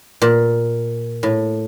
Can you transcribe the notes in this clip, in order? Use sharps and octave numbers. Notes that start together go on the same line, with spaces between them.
A#2
A2